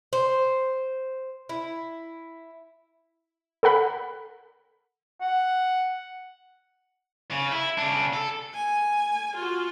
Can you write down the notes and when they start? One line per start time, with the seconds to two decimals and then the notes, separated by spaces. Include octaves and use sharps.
0.13 C5
1.49 E4
3.63 A4 A#4 F#5 B5
5.21 F#5
7.32 C#3
7.52 E4
7.78 C#3 D4
8.13 A4
8.54 G#5
9.35 F4 F#4